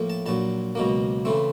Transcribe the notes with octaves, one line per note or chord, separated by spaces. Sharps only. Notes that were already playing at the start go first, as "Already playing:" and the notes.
Already playing: A2 F3 A#3
A5
A#1 A#2 F#3 A5
C#2 B2 F#3 A#3
C#3 E3 A3 C4